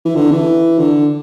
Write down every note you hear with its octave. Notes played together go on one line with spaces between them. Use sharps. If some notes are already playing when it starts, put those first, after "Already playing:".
E3
D3
E3
D3